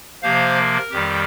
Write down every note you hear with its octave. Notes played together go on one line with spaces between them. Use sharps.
C3 F3 A#3 C5 F5
A#4
F2 D#3 G3 G4